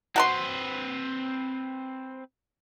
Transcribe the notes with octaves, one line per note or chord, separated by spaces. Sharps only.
C4 F#4 B4 A#5 C6